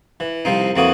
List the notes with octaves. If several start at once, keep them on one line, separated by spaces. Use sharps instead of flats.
E3
C2 F3 C4 D#4
F2 E3 A#3 F#4 D#6